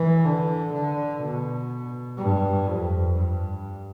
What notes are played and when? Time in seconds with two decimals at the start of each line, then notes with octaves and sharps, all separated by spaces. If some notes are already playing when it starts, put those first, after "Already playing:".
Already playing: E3
0.24 D3
0.73 D3
1.21 B2
2.18 G2
2.67 F2
3.15 G2